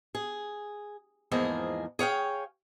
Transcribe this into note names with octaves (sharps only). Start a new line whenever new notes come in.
G#4
E2 G#2 F3 A#3 G#4 D#5
G#4 C#5 F5 G5